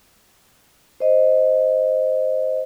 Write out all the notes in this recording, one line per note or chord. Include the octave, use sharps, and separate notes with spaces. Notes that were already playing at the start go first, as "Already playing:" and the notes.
C5 D#5